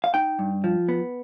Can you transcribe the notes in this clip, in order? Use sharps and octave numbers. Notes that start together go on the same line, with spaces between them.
F5
D#4 G5
G2
F3
B3